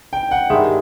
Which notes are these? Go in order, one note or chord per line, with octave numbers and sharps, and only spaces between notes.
G5
F#5
G2 D#3 G#3 E5